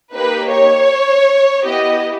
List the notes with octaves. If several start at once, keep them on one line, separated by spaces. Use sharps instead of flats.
A#3 D#4 G4 B4
C#5
B3 E4 G4 D#5